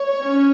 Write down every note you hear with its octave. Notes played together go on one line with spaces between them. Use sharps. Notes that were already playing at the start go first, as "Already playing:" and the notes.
Already playing: C#5
C#4